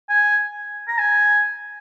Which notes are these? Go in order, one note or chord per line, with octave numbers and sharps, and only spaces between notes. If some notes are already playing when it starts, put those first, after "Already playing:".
G#5
A#5
G#5